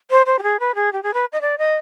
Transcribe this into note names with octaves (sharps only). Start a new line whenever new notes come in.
C5
C5
G4
G#4
B4
G#4
G4
G#4
B4
D#5
D5
D#5